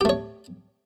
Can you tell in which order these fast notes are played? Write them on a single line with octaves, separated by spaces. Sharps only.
G4 A3 C#5